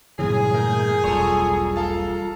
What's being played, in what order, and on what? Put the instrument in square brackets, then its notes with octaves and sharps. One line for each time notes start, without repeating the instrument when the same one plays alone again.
[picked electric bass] G2 A#2 E3 [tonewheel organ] C#3 F#3 [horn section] G#4
[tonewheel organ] A3 G6 [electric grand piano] A#4
[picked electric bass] E1 B1 [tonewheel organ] G3 F4 A#5 [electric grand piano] A4 C#6
[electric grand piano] A4 F5 A5